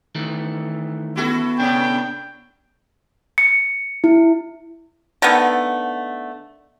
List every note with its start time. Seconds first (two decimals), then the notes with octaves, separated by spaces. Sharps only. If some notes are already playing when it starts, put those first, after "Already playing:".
0.15 D#3 E3 A3
1.16 B3 E4 F#4 A4
1.60 A2 C3 D4 G5
3.38 C#7
4.04 E4
5.22 D3 D#3 A3 B3